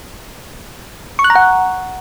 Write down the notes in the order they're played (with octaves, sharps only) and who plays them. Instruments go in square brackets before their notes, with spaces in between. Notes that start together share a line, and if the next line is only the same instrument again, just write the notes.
[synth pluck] C#6
F#6
A#5
F#5